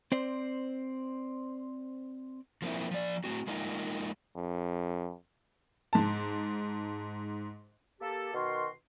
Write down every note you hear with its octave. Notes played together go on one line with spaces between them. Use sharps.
C4 C5 D5
F3 A#3 C4 E4
F3 D5
A3 C4 F#4
G#3 A#3 D#4 F4
F2
G#2 A5
A#3 G4 A4
B2 D#3 F#4 A#4 C6